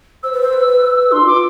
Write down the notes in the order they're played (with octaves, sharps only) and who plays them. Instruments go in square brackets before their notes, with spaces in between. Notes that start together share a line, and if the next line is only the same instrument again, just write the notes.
[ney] C5 [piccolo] E6
[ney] B4
C5
B4
[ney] D4 [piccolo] C6
[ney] F4
[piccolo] D6
[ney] F4